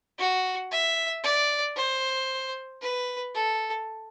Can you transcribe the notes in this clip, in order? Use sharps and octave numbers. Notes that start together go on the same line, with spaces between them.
F#4
E5
D5
C5
B4
A4